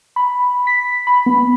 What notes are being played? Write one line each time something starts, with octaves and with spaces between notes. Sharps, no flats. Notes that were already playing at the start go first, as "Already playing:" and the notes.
B5
B6
B5
B3